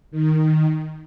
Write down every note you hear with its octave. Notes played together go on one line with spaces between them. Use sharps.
D#3